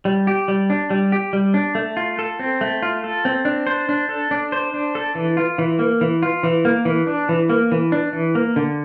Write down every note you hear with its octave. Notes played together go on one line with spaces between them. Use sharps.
G3
G4
G3
D4
G3
G4
G3
D4
A3
F4
A4
C4
A3
F4
A4
C4
D4
C5
D4
A4
D4
C5
D4
A4
E3
F4
E3
A#3
E3
F4
E3
A#3
E3
D4
E3
A#3
E3
D4
E3
A#3
D3